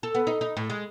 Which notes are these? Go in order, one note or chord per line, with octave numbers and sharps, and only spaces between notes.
A4
B3
D#4
D#4
A2
G#3